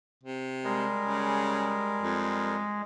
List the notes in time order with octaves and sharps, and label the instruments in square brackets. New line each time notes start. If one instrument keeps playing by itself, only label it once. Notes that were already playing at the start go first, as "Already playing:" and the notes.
[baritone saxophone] C3
[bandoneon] G3 A#4 [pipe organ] G#3
[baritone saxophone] C#3
F2